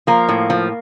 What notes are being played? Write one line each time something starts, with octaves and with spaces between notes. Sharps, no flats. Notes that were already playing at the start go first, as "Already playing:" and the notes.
F3 A#3
A2
F3